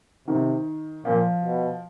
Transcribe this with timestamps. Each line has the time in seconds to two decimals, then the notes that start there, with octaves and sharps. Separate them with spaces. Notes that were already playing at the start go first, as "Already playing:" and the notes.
0.28 C3 D#3
1.05 A#2 F3
1.43 B2